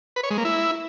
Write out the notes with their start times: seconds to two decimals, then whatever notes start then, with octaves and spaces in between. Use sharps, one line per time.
0.16 B4
0.23 C#5
0.31 G#3
0.38 A#3
0.45 E4